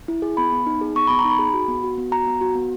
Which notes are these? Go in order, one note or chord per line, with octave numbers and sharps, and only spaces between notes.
E4
G#4
B3 B5
B3
D#4
G#4
B3 C#6
B3 B5
A#5
D#4
B5
G#4
F#4
B3
F#4
B3
F#4 A#5
B3
F#4
B3